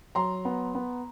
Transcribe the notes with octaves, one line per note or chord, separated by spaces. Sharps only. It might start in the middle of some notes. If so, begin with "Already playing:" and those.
F#3 A#5 C6
B3
B3